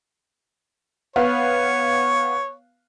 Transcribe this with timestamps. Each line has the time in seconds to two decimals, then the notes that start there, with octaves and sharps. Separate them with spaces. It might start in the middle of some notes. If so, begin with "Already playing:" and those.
1.16 B3 C#5 F5